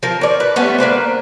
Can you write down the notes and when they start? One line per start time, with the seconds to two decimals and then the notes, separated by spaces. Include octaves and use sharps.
0.03 F3 A#4
0.21 C#5 D5
0.40 B4
0.56 G3 A3 B3 C#4
0.78 A#3 D4 B4 C5